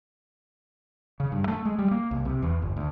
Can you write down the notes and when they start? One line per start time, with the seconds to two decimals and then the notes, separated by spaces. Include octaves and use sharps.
1.20 C#3
1.32 G2
1.48 A3
1.65 G#3
1.78 G3
1.91 A#3
2.11 C2
2.25 C3
2.42 E2
2.62 G1
2.77 D2